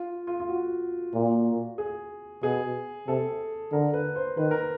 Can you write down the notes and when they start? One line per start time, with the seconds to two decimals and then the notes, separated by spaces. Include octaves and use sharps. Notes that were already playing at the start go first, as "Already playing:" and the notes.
Already playing: F4
0.27 F4
0.40 F4
0.49 F#4
1.14 A#2
1.78 G#4
2.43 B2 G#4
3.07 C3 A4
3.72 D3 A#4
3.94 B4
4.16 C5
4.37 D#3 B4
4.51 A#4